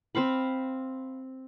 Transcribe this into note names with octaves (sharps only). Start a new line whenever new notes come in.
C4 C5 F5 B5